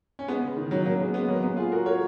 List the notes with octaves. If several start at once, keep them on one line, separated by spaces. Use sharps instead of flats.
C#4
G#3 B3
C#3
D#3
D#3 F#3
F#3 A#3
G#3 B3
G#3 B3
F#3 A#3
G#3 B3
F4 G#4
F#4 A#4
A#4 C#5